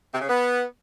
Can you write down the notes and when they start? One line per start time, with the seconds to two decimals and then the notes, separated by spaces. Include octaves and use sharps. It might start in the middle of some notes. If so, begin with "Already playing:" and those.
0.13 C3
0.21 C#3
0.29 B3